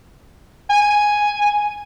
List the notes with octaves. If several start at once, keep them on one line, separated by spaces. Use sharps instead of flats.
G#5